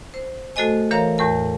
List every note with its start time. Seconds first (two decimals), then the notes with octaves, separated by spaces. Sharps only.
0.14 C5
0.56 A3 F#4 A4 C5 D#5 G#5
0.91 E3 A#4 C#5 F5 A#5
1.18 E2 A2 A#4 A5